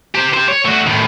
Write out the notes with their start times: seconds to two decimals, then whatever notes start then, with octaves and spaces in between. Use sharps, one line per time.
0.15 G4 C5
0.34 G4 C5
0.48 C#5
0.65 A3 F#4
0.87 A2 D#3